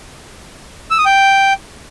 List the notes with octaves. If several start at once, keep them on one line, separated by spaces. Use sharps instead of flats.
E6
D#6
G5